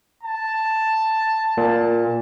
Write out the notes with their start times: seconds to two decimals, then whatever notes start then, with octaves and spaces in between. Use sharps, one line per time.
0.23 A5
1.57 A#2